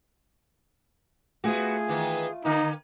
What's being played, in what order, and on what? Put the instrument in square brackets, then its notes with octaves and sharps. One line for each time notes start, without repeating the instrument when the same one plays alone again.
[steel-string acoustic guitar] A3 F4 [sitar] B3 F#4 [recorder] G#4
[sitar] D#3 E3 B3
[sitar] D3 A#3 [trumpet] D#4